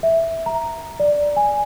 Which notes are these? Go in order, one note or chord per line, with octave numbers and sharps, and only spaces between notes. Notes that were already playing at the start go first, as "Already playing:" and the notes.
E5
A#5
D5
G#5